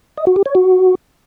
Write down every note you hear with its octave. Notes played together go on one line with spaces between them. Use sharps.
D#5
F#4
G4
C#5
F#4